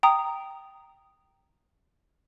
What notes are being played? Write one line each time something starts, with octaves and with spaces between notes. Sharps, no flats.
G5 A#5 D#6